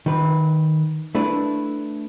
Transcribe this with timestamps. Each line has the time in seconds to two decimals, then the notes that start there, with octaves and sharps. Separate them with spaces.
0.06 D#3 B4
1.15 A3 D4 E4 B4